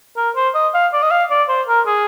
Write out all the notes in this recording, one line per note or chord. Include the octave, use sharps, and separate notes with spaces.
A#4
C5
D#5
F5
D5
D#5
F5
D5
C5
A#4
G#4